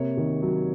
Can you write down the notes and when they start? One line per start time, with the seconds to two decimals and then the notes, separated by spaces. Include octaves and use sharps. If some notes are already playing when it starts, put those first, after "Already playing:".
Already playing: C3 A#3 C#5
0.17 D#3
0.42 F#3